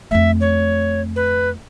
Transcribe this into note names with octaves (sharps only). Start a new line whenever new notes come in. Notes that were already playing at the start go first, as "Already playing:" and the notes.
F2 A3 E5
C#5
B4